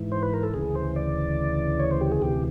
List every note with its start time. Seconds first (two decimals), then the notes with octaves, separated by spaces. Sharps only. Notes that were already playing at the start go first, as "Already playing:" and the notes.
Already playing: G#2 E3
0.12 C5
0.23 B4
0.34 A#4
0.43 A4
0.54 D2 C#3 E3 G#4
0.75 C5
0.96 D5
1.80 C#5
1.91 C5
2.01 G4
2.12 G#4
2.22 D2 C3 E3 G4